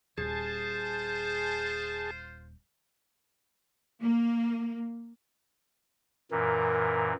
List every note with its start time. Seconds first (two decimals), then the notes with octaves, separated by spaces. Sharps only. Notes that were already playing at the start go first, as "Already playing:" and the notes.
0.18 D#1 F4 G#4 C5 A5
4.02 A#3
6.31 F#2 A#2 E3 A#4